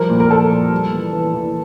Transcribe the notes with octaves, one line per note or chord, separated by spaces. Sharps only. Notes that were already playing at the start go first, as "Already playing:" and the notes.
Already playing: F3 G3 A#4
A#2
A#4
F3 A4
A#2
G3
E3
E3
E3